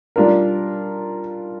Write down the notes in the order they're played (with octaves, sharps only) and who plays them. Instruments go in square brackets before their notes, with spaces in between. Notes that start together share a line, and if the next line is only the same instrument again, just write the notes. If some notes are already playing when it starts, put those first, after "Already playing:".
[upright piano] G3 D4 F4 A#4